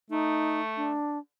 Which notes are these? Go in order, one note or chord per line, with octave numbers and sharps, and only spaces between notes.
A3 D#4
D4